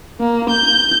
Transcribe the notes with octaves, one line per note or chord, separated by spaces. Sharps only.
A#3
G6